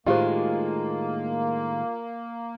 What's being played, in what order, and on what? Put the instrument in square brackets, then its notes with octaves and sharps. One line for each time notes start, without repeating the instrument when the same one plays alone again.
[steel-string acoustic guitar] A2 D#3 G#3 [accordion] A#3 [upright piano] F4 [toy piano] G4 C5